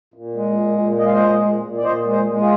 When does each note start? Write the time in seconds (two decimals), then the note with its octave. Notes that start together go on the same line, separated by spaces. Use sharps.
0.14 A#2
0.35 G#3
0.56 A#2
0.78 A#2
0.99 G#3 D#5
1.06 F5
1.13 C5 D#5
1.20 A#2
1.42 A#2
1.62 A#2
1.78 D5
1.84 A#2 C5 D#5
2.05 G#3
2.12 G#4 C5
2.27 G#3
2.40 F4 G#4